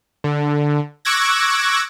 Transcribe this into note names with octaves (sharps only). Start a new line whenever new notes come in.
D3
C#6 D6 E6 F#6 G#6 A#6